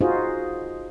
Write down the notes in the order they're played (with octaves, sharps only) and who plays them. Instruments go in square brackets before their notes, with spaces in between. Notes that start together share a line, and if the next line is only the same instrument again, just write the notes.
[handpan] D#4 F4 F#4 G#4 C5 D#5